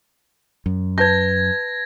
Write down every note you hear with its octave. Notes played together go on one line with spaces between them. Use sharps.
F#2
B4 A5 G6 G#6 A#6